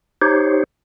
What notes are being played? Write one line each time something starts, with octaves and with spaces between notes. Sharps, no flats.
D#4 G4 C5 C#5